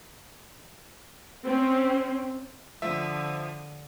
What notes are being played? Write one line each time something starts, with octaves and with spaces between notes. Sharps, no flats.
C4 C#4
D3 F3 E5 D#6